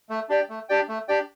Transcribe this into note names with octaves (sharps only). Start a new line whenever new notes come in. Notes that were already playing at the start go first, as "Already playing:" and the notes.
A3
D4 G4 D5 G5
A3
D4 G4 D5 G5
A3
D4 G4 D5 G5